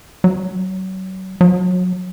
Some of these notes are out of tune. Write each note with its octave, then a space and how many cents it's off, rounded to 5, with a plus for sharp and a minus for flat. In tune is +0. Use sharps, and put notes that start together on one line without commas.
F#3 +30
F#3 -25